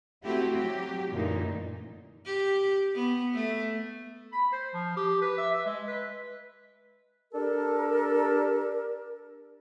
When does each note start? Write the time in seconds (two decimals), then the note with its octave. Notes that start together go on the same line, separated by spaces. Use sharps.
0.24 A3 C4 E4 F#4 G4
0.55 F#3 G4
1.11 F#2 A#2 D3 E3 A3 D#4
2.26 G4
2.95 B3
3.34 A3
4.32 B5
4.52 C5
4.74 F3
4.97 G4
5.22 B4
5.38 E5
5.52 E5
5.66 G#3
5.87 B4
7.32 D4 G4 A4 A#4